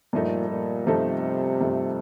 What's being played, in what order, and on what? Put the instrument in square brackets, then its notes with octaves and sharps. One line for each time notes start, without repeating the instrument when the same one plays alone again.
[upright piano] G2 F3 A3 D#4 A4 [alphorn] A#2
[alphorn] A#2
[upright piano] G2 F3 A3 D#4 A4 [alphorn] C3
[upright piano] G2 F3 A3 D#4 A4